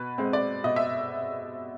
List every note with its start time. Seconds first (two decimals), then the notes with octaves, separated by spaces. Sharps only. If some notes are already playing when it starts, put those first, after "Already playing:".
Already playing: B2 B4
0.18 G#3 C4
0.33 D5
0.64 B2 D#5
0.76 E5